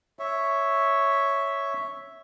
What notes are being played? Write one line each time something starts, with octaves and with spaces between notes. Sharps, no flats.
C#5 E5